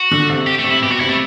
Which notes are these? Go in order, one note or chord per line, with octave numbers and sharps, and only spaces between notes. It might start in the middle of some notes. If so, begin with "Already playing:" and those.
Already playing: F#4
D3
C3
G4
A3
C3
E4
B2 G4
F#4
C3 E4
A3